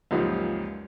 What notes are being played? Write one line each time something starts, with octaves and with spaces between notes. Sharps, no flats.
C#2 F#2 A#2 F3 D#4 G4